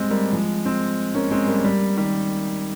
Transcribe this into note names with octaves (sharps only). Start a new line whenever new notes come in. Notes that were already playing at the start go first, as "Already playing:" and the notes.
Already playing: G3 G#3 C4
G3 A#3
F3 G#3
G#3 C4
A#3 C#4
G#3 C4
G3 A#3
G3 A#3
D#3 G3